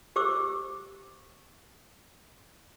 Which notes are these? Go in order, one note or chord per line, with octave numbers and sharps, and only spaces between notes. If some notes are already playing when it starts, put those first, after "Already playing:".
G4 C5 D6 E6